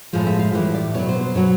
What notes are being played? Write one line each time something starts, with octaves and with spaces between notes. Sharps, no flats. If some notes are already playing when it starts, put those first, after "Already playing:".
A2 F3 G#3
E5
F5
A2 E3 G3
D5
B2 F#3 C#5
C5
C5
B2 F#3 C#5